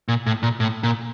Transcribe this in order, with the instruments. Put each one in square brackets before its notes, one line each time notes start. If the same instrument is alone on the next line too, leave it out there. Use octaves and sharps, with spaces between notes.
[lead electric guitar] A#2
A2
A#2
A2
A#2